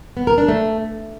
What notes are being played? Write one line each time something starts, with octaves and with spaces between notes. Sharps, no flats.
B3
A#4
D4
A3